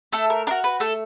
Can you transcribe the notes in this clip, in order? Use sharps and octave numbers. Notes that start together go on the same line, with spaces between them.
A3 A4
A#4
D4 F#4 A#4
B4
A3 A4